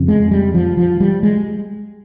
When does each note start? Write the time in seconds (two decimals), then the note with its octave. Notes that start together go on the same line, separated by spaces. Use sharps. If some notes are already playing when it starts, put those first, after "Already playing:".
Already playing: F2 C#3
0.08 G#3
0.31 G3
0.54 F3
0.77 F3
1.00 G3
1.23 G#3